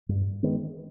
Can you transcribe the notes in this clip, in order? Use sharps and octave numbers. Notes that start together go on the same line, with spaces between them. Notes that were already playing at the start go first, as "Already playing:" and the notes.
G2
D#3 G#3 B3